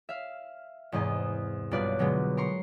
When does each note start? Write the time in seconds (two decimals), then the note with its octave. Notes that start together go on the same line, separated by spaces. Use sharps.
0.09 E5 F5
0.92 E2 G#2 C3 D#5 G#5
1.71 B1 G2 F4 B4 D5 F#6
1.99 B2 D3 F#3 G#3 B3
2.37 A#4 A#5 C6 C#6